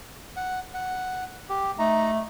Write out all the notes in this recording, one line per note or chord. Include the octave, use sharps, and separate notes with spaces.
F#5
F#5
G4
A3 D#4 A#5